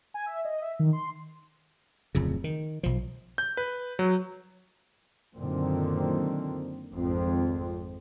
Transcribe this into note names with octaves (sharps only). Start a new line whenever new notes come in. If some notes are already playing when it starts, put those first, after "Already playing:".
G#5
E5
D#5
E5
D#3
C6
D1 F2 C#3
D#3
B1 F3
G6
B4
F#3
F#2 A#2 D3 D#3 C4
G#1 F2 C4